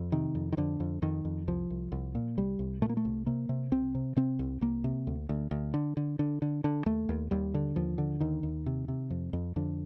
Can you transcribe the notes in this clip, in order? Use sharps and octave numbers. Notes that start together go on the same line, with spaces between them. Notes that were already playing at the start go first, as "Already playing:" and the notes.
Already playing: F2
C3 D#3
F2
D#3
F2 D3
F2
F2 D#3
F2
C2 F3
C2
C2
A#2
C2 G3
C2
A#2 A3
A#3
A3
C2
C3 A#3
C3
C2 C4
C3
C3 C4
C2
C2 A#3
C3
D2
D2
D2
D3
D3
D3
D3
D3
D#2 A3
D#2
D#2 G3
D3
D#2 F3
D3
D#2 D#3
D#2
C3
C3
F2
F2
F2 D3